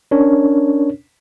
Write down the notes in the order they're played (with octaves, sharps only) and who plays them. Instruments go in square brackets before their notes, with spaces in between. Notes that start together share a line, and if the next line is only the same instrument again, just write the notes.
[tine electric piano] C#4 D4 A#4 C#5